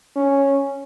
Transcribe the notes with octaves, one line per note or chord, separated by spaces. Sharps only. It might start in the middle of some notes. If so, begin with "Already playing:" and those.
C#4